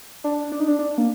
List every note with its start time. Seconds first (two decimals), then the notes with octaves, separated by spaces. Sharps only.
0.24 D4
0.52 D4
0.60 D#4
0.68 D4
0.79 D4
0.98 A#3